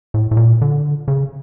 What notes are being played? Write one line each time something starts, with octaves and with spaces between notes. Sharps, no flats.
A2
A2
A#2
D3
C#3